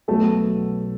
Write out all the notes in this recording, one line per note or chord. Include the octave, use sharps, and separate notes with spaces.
B1 B2 A3 B3 F#4 A4